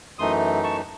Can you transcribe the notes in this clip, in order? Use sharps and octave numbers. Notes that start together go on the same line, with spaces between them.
F#2 E3 A3 D#4 C6 D#6
A5 C#6